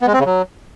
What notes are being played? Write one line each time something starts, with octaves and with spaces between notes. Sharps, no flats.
B3
G#3
C4
C#3
F#3